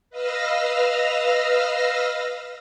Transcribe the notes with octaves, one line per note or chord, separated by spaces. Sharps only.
B4 D#5 F5 E6 F6 A#6